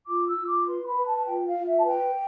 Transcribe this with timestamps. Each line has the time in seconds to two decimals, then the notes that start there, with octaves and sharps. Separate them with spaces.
0.07 F4 D6
0.27 E6
0.38 F4
0.47 D6
0.68 B4 C6
0.87 B5
0.96 B4
1.06 A5
1.26 F4 G5
1.47 F5
1.57 F4
1.66 E5
1.79 A5
1.85 B4 G5